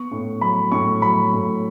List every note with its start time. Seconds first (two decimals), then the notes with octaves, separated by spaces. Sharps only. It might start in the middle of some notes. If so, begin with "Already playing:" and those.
Already playing: B3 C#6
0.12 A2
0.41 F#3 B5
0.72 A2 C#6
1.02 F#3 B5
1.33 A2